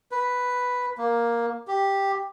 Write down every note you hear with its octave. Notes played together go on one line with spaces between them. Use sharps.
B4
A#3
G4